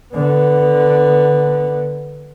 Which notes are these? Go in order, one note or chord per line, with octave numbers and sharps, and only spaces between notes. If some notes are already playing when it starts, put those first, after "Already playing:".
D3 B3